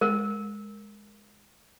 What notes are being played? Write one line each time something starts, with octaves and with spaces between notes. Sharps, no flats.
G#3 A#4